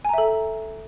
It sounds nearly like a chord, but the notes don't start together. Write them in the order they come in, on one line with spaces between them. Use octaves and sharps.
G#5 A#5 E5 A4